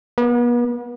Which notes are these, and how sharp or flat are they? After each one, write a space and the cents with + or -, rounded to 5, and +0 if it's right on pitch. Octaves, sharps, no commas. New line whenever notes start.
B3 -40